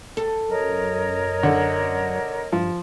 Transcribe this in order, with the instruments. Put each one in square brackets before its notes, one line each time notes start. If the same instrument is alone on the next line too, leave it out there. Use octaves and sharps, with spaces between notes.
[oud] A4
[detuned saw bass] F#2 [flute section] A#4 C#5 D#5
[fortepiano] D3
[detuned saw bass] G2 [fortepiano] F3